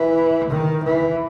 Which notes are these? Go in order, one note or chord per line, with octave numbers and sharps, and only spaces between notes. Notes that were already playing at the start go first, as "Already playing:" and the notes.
Already playing: E3
D#3
E3